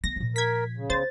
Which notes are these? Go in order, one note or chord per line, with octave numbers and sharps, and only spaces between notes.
B3 A#6
A#2 F3
A#4 G#6 B6
C#3
B3 C5 A6